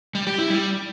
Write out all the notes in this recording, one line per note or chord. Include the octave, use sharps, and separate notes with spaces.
G3
G4
E4
G3